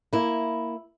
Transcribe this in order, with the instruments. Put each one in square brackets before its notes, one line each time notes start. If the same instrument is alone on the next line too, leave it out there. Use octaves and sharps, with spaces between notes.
[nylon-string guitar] A#3 E4